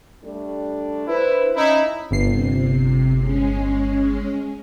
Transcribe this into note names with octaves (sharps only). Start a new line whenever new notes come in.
G3 A3 D4
D4 E4 B4 C5
C#4 D#4 E4
G1 C3 C7
G#3 C#4